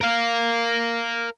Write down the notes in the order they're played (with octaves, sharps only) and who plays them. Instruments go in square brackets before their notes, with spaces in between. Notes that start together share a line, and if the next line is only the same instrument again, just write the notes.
[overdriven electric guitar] A#4 F5